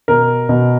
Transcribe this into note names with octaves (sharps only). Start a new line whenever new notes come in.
B2 A#4
B2